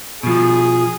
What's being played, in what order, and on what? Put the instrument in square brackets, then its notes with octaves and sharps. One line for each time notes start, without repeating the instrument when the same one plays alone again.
[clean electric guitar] B2 F3 [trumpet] G#4